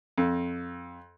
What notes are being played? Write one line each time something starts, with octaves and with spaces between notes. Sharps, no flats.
F2